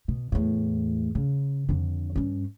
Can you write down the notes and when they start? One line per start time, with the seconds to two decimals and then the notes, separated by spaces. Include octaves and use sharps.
0.08 B2
0.32 E2 A2
1.15 C#3
1.69 F2 D3
2.16 G2 C#4